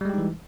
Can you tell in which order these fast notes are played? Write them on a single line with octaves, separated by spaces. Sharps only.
G3 G#3 G4 D#4 E3